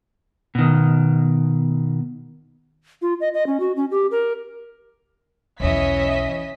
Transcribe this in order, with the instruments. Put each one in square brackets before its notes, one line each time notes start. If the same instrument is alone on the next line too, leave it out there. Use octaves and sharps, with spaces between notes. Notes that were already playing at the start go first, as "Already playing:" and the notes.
[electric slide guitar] B2 D#3
[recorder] F4
D#5
D#5
C#4
F#4
C#4
G4
A#4
[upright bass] B1 E2 [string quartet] E3 C#4 [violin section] D#5 E5 B6